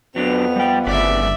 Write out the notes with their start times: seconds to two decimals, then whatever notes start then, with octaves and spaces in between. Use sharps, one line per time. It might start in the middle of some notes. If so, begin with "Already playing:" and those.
0.16 F2 F#3 B3 D4 F7
0.56 G3 G5
0.87 G1 A2 C#3 B4 D5 E5